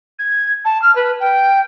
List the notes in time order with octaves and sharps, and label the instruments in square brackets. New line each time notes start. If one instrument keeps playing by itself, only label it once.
[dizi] G#6
A5
F6
B4
G5